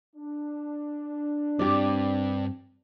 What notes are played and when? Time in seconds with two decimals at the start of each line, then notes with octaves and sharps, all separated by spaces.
0.16 D4
1.59 G2 C4 G4 D5